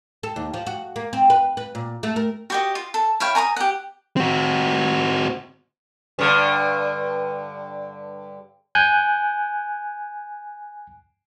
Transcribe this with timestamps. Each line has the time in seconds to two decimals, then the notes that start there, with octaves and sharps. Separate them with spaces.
0.23 A4
0.36 D#2
0.54 F3
0.67 F#4
0.96 A#3
1.13 C4
1.30 B4
1.57 B4
1.75 A#2
2.03 A3
2.16 A#4
2.50 F#4 G4 D#5
2.75 F4
2.94 A4
3.20 E4 C#5 F5 G5
3.35 G#5 A#5 C#6 D#6
3.56 G4 F#5
4.17 C4 F#4
6.19 G2 D3
8.75 G#5 F#6 G6